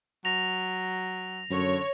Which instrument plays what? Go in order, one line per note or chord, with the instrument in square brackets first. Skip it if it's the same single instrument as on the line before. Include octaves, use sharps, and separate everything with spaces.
[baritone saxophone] F#3 [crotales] A#6 F7
[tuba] F#2 [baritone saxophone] D3 [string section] C#5